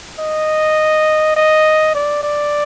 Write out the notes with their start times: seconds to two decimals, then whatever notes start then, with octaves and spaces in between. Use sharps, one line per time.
0.19 D#5
1.36 D#5
1.95 D5
2.23 D5